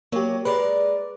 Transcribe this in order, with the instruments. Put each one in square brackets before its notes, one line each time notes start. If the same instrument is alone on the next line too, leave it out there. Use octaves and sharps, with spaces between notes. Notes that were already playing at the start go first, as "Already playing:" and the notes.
[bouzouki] F#3 [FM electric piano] A#3 G4
[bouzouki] G#3 A#4 D5 [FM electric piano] B4